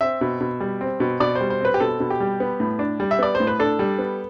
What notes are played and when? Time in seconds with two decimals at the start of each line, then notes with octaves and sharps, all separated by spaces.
0.01 C4 E5
0.21 B2
0.41 B2
0.60 G3
0.81 C4
1.00 B2
1.20 B2 D5
1.35 C5
1.41 G3
1.50 C5
1.61 C4 B4
1.74 G4
1.80 B2 A4
2.00 B2
2.10 G4
2.20 G3
2.40 B3
2.60 A2
2.79 D4
3.00 G3
3.11 E5
3.19 B3 D5
3.35 C5
3.40 A2
3.47 B4
3.59 D4 A4
3.79 G3
3.98 B3